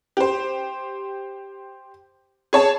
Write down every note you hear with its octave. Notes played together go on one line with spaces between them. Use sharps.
G4 C5
G#4 C#5 A5